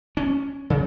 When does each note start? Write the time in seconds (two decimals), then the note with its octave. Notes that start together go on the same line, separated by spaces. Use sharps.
0.17 C#4
0.70 C#3